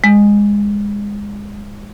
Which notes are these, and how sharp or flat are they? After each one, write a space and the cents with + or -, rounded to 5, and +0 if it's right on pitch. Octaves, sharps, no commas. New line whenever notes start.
G#3 -20